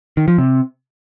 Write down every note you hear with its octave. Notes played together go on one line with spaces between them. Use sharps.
D#3
F3
C3